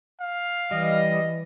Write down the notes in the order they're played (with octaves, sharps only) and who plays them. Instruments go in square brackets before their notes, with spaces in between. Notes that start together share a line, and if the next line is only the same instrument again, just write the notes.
[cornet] F5
[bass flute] E3 [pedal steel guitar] G3 [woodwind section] D#5